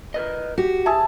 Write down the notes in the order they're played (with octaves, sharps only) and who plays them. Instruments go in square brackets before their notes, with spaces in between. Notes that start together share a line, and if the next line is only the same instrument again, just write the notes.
[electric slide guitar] A#4 B4 D#5
[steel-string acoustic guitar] F#4 [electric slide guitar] G4
[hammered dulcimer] G#4 E5 A5